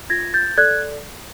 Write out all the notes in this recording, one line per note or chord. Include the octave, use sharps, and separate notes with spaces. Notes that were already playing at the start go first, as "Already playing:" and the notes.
F4 G#6 A#6
G6 A6
A4 D5 F#6 G#6